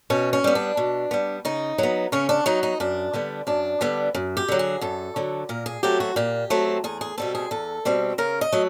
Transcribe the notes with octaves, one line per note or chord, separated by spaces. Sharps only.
B2 C#4
C#4
G3 B3
D4
B2
G3 B3
C#3 D#4
F#3 B3
C#3 C#4
D4
F#3 B3 D#4
D#4
F#2 D4
D3 G3 B3
F#2 D4
D3 G3 B3
F#2
G4
D3 F#3
G#4
F#2 A4
D3 F#3
A#2 A#4
G#4
F#3 A3 C4 G4
F#4
A#2 G4
F#3 A3 C4
E2 G#4
G#4
B2 G3 C4 A4
G#4
E2 A4
B2 G3 C4
C#3 A#4
D#5
F#3 A3